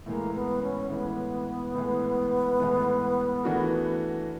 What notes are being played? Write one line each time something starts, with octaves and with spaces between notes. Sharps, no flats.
A2 E3 G#3 A#3
B3
C#4
A2 E3 G#3 B3
A2 E3 G#3
A2 E3 G#3
E3 A3 D4 F#4 A#4